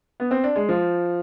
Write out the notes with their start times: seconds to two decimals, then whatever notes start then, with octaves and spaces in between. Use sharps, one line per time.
0.20 B3
0.31 C4
0.44 D4
0.56 G#3
0.69 F3